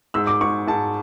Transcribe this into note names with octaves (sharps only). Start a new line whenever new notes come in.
G#2 E6
D6
G#2 C#6
G#2 A5